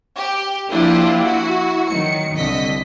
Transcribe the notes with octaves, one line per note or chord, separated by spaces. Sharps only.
G4
F3 A#3 D4 E4 F4 G4
E4 F#4
D#3 F#3 C#7
C2 D3 D#5 B6